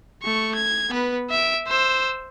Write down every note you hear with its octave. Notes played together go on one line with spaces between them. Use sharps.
A3 C#6
G#6
B3 B4
E5 D7
C5 E6